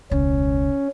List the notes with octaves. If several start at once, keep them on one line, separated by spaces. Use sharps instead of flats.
E1 C#2 C#4